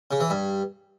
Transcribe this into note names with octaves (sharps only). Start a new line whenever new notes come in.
C#3
E3
G2